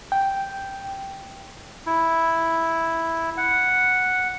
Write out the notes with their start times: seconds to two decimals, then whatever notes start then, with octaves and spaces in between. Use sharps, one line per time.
0.12 G5
1.86 E4
3.37 F#5